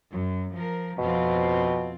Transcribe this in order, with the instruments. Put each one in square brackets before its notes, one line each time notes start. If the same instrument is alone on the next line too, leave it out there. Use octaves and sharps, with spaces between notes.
[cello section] F#2
F3 A#4
[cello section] F2 C4 F4 [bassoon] B2